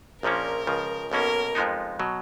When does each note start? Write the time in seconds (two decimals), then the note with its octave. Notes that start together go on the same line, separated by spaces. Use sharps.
0.23 A#1 A#2 F3 A#3 C#4 A#4
0.67 C#2 C#3 F3
1.12 B1 B2 A#3 C#4 A#4
1.55 F2 F3 G#3 B3 D#4
1.99 B2 F#3